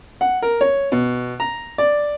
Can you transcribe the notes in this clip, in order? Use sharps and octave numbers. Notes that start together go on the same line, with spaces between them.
F#5
A#4
C#5
B2
A#5
D5